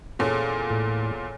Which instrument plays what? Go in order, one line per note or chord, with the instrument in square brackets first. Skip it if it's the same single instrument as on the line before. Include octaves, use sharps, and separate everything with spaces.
[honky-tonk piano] E2 A#2 [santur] C#4 G#4 A4
[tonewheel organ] A2